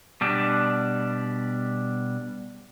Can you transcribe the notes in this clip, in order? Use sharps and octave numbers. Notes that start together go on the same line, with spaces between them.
B2 G3 D4